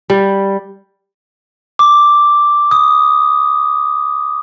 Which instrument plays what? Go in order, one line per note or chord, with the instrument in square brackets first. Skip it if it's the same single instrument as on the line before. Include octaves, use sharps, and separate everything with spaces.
[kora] G3
[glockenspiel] D6
D#6